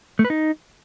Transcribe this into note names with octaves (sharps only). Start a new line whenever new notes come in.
A3
B4
D#4